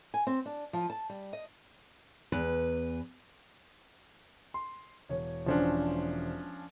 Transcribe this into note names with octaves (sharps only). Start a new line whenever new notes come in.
G#5
C4
D4
F3
A5
G3
D#5
E2 B4
C6
E1 C#5
E1 F3 C#4 D4 C5